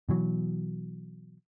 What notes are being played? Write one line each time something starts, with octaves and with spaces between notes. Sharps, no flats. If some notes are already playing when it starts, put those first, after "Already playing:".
B2 E3 F#3